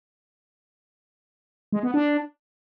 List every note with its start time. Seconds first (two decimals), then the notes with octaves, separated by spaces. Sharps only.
1.72 G#3
1.83 B3
1.94 D4